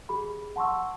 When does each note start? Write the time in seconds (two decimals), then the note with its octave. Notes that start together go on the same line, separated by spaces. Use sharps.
0.09 G4 G#4 B5
0.56 F#5 A5 C6 C#6 E6